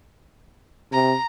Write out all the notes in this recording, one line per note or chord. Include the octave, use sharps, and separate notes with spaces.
C3 A#5